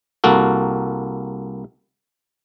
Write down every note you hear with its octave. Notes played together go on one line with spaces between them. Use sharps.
C2 A#3 F#4 A4